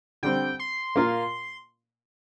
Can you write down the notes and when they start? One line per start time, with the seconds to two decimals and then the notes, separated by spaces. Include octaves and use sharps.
0.23 D3 G3 C4 G5
0.59 C6
0.96 A#2 A#3 F4 A#4